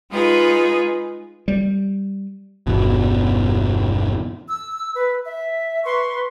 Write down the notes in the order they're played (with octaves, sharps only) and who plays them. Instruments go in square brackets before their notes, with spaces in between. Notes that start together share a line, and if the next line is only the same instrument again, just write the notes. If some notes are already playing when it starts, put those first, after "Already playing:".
[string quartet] G#3 D#4 F4 G#4 B4
[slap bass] G3
[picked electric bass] G1 E2 B2
[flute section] E6
B4
E5
B4 C6 C#6